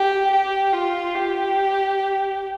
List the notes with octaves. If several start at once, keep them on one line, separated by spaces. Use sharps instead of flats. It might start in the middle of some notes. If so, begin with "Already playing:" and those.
Already playing: G4
G4
F4
G4